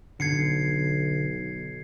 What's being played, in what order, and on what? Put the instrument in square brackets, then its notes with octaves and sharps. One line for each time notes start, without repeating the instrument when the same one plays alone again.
[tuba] B1 [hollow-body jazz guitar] D3 [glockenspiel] G#6 C7 C#7